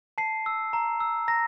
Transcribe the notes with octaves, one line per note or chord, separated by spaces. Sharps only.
A5 C7
E6
A#5
E6
A#5 A#6